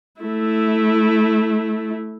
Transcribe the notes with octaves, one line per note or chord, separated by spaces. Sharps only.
A3 E4